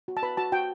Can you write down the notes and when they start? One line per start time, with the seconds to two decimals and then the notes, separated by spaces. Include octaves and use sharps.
0.08 F#4
0.17 A5
0.23 B4 B5
0.37 F#4 A5
0.52 F#4 G5